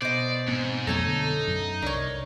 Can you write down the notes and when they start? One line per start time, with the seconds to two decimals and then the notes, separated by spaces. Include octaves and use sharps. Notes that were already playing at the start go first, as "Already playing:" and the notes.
0.02 B2 C5 D5 D#5
0.48 G#2 B3 C4
0.87 F2 F#3 A3 D#4 A4 C#5 A5
1.06 D3
1.48 F#2
1.82 C2 D4 A#4 C#5